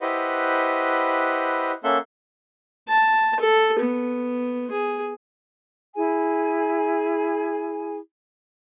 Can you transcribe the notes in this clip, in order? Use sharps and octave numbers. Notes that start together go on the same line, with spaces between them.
E4 G4 B4 C5 D#5 F#5
A#3 C#4 A4 E5 F#5 C6
A5
A4
B3
G#4
E4 G#4 G#5